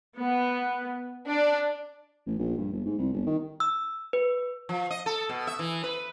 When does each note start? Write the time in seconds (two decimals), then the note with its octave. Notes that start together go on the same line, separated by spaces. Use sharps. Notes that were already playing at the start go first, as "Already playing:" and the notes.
0.18 B3
1.27 D4
2.26 A1
2.39 A#1
2.58 G2
2.73 G1
2.85 G#2
2.98 C2
3.12 G1
3.26 D#3
3.60 E6
4.13 B4
4.69 F3
4.91 D#5
5.06 A4
5.29 B2
5.47 E5
5.59 E3
5.84 B4